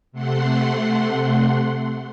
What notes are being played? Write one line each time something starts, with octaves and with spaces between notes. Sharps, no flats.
C3 A3 F#5 C6